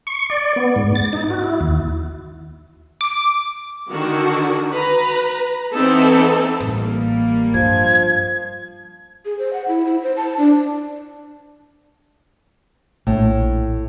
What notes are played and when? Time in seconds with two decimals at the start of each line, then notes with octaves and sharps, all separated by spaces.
0.07 C#6
0.30 D5
0.56 B3
0.76 G#2
0.95 A6
1.13 D#4
1.30 F#4
1.44 E4
1.61 D#2
3.01 D6
3.90 D3 D#3 F#4
4.73 B4 A#5
5.73 E3 B3 C4 D#4 A4
6.60 A1 G3 A#3
7.54 G2 F3 G#6
9.25 G#4
9.39 C5
9.53 F#5
9.68 E4
9.86 E4
10.03 C5
10.16 A5
10.38 D4
13.07 A#1 A2